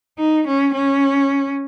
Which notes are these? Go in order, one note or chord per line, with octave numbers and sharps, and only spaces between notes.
D#4
C#4
C#4